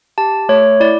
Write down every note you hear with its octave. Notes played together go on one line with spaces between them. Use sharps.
G4 A5
A3 C#5
E4 D5